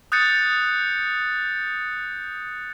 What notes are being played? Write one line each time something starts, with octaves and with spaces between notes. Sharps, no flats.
D#6 F#6 G6 A6 C#7